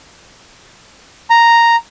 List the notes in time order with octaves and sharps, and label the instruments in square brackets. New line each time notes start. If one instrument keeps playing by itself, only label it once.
[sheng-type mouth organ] A#5